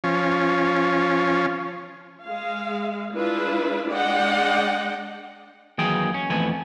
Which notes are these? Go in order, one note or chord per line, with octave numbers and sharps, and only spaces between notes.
F3 C#4
G#3 F5
G#3 D4 E4 F4 B4
G#3 D4 D5 D#5 F#5 G5
D#2 E3 F#3 G#4 G5
C#4
F2 E3 A3 B3 G#5